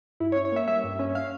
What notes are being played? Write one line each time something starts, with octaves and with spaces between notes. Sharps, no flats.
G2 E4
C#5
C#4
C#5
A#3 E5
G3 E5
G2
C#4
F5